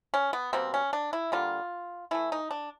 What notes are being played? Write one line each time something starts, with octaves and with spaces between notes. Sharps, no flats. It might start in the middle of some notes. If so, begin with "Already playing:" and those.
C#4
B3
B2 G3 A#3 C4
C#4
D4
E4
D3 G3 A#3 F4
E3 A3 E4
D#4
D4